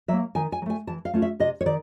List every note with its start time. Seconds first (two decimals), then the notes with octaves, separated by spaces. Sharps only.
0.08 F#3 A#3 E5
0.35 D#3 G#5
0.52 G#5
0.62 F#3
0.66 A3 G#5
0.87 E3 A5
1.05 F5
1.13 A3 C#4 F4
1.22 E5
1.40 C3 D#5
1.61 C#5
1.66 D#3 D5